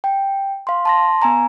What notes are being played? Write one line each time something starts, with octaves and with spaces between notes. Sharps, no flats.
G5
F5 C6
A5 C6 A#6
B3 G#5 A#5